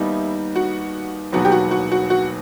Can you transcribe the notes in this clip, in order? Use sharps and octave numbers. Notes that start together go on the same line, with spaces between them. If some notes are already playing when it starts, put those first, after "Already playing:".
Already playing: D#2 D#3 G3 B3 D#4 E4
F#4
E1 D#2 D#3 F#3 B3 F#4
G4
F#4
F#4
F#4
F#4